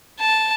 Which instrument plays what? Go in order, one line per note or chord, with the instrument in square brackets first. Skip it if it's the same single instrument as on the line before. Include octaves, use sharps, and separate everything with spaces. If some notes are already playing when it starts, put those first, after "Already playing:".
[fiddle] A5